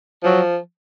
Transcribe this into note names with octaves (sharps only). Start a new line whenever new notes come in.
F3 F#3